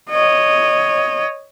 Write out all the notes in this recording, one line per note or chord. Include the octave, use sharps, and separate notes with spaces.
C#5 D#5